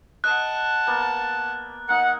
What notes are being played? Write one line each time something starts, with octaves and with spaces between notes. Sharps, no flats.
D#5 F#5 A5 F#6
A#3 B3 D5
A#3 D#4 F#5